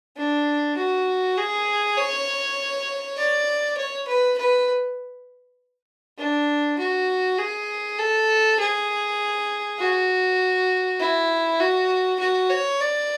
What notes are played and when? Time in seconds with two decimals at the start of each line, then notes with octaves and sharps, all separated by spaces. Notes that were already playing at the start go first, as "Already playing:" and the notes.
0.17 D4
0.77 F#4
1.37 G#4
1.98 C#5
3.18 D5
3.78 C#5
4.08 B4
4.38 B4
6.19 D4
6.79 F#4
7.38 G#4
7.99 A4
8.60 G#4
9.79 F#4
11.00 E4
11.60 F#4
12.20 F#4
12.50 C#5
12.81 D5